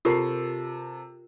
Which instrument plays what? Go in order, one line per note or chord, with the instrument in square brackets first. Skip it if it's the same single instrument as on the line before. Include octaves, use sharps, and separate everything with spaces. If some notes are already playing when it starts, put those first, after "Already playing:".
[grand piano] C3 A4 C7 [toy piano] F4 G4 A#4